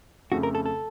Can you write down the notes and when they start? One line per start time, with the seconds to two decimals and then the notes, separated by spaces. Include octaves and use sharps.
0.32 F2 C#3 A3 F#4
0.43 A#4
0.55 A4
0.66 A4